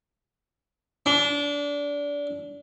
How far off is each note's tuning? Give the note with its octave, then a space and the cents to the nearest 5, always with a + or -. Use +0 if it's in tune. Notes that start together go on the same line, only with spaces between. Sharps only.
D4 -25